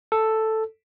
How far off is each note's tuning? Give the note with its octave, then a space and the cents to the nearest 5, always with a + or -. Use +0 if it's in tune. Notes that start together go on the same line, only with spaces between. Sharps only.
A4 +0